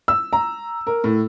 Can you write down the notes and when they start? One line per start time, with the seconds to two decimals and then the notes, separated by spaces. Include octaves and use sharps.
0.08 E6
0.33 A#5
0.87 A#4
1.04 A2